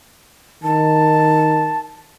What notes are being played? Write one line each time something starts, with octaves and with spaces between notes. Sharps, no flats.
D#3 A5